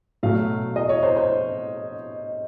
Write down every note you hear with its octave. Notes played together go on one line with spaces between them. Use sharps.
B2 F#3 A3 F5
D#5
C#5
C5
C5